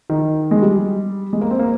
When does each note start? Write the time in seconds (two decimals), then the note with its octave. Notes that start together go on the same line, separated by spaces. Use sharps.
0.10 D#3
0.51 G#3
0.62 G3
1.33 G#3
1.41 A#3
1.51 C4
1.59 A#3